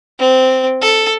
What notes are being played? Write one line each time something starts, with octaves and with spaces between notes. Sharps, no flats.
C4
A4